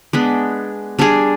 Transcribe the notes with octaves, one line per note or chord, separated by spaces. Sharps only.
G#3 B3 D4
G3 D4 G#4